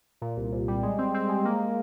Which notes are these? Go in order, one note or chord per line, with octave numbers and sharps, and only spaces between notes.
A#2
C2
C2
G3
G#3
C4
C4
G#3
A#3